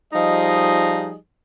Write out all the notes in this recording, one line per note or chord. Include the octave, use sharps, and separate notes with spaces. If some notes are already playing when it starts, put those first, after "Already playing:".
F3 G3 D#4 G#4 D#5